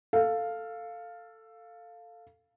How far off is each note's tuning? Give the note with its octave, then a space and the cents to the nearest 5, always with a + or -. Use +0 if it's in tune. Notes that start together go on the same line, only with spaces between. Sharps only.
A4 +10 F5 +0